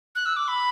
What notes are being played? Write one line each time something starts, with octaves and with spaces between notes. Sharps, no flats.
F#6
E6
D6
B5